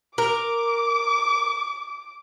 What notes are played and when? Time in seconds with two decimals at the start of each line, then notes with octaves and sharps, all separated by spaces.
0.18 A#4 D6